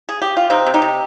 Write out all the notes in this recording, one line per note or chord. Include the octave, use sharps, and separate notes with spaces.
G#4
G4
F4
C3 C4 D#4
C3
D#4 G4
C3